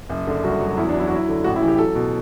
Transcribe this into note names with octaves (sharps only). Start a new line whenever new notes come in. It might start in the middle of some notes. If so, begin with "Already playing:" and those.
F#1
D3
C2 F#4
F#3
E2 E4
D4
F#3
E4
F#4
F#3
E4
D3
A1 F#4
E4
E3
G4
F#3 A4
B2